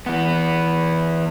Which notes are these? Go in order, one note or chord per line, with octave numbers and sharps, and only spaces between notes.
E3 B3